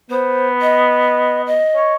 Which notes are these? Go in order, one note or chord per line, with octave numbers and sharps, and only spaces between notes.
B3 C5
D#5
D#5
C#5